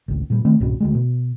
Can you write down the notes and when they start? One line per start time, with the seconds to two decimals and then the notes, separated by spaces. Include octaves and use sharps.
0.08 G#1 C#2
0.30 A#2 G3
0.45 C3 D#3 A3 C4
0.60 C2 G#2 B2 C#4
0.80 D2 G3 G#3
0.95 B2